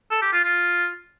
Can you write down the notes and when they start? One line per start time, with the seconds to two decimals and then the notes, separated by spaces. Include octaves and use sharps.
0.11 A4
0.22 G4
0.33 F4
0.44 F4